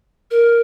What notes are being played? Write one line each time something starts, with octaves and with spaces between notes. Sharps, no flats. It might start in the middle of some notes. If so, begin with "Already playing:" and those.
A#4